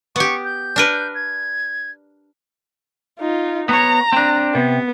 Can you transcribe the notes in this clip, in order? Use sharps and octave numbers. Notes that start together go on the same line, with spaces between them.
B3 G4 C#6
G6
D4 A#4 B4
G#6
D#4 F4
B3 C#5 A#5
C4 D4
C3 B3